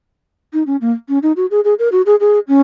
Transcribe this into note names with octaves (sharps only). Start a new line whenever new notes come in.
D#4
C#4
A#3
C#4
D#4
F#4
G#4
G#4
A#4
F#4
G#4
G#4
C#4